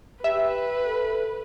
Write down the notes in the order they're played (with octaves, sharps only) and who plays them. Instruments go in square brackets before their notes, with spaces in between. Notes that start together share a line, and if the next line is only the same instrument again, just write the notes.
[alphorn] G4 [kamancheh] B4 [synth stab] E5
[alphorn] A4